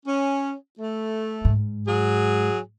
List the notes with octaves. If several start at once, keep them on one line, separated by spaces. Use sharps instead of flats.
C#4
A3
G#2
F#3 G#4